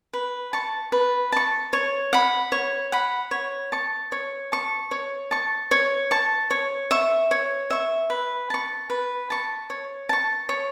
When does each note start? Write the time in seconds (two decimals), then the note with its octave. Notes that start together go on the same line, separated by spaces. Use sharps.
0.13 B4
0.53 A5 C#6
0.92 B4
1.32 A5 C#6
1.73 C#5
2.13 F#5 B5
2.52 C#5
2.92 F#5 B5
3.31 C#5
3.72 A5 C#6
4.12 C#5
4.52 A5 C#6
4.91 C#5
5.31 A5 C#6
5.71 C#5
6.11 A5 C#6
6.51 C#5
6.91 E5 C#6
7.31 C#5
7.70 E5 C#6
8.10 B4
8.50 A5 C#6
8.90 B4
9.30 A5 C#6
9.70 C#5
10.09 A5 C#6
10.49 C#5